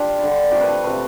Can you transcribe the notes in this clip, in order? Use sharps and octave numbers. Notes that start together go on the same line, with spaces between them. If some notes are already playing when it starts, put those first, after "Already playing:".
Already playing: D4 F4 G4
D3 G3
C3 F3 A3 G4
B4
A4
C3 F3 A3 B4